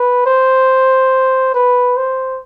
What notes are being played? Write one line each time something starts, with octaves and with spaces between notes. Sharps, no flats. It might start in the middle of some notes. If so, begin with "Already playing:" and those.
Already playing: B4
C5
B4
C5